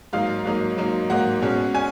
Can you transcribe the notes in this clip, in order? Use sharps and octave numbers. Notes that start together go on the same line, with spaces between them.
G#2 F#3 A#3 D#4 F5
G#2 F#3 A#3 D#4
G#2 F#3 A#3 D#4
G#2 F#3 A#3 D#4 F#5
B2 G#3 C#4
C#4 G#5